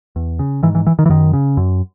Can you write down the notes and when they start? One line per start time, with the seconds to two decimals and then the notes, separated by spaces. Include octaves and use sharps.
0.16 E2
0.39 C#3
0.63 G#2 E3
0.75 E3
0.87 E3
0.99 D#3
1.06 E3
1.09 F#2 D#3
1.33 C#3
1.57 F#2